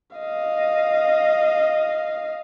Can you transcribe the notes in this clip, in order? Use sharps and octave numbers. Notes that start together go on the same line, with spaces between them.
D#5 F5